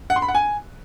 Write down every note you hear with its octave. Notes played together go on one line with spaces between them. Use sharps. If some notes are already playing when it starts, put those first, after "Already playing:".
F#5
C6
B5
F#5
G#5